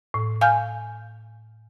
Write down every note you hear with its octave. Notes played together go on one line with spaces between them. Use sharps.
A2
F5 G#5 F6 G6